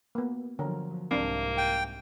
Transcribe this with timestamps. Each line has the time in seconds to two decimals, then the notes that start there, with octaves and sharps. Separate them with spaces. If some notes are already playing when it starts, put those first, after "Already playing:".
0.15 A#3 B3
0.59 D3 F3 F#3 A#4 C#5
1.11 C2 G#2 A#3 C4 D4
1.58 G5